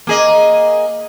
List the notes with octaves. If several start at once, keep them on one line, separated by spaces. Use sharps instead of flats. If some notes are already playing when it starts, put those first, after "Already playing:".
A#3 G#4 D#5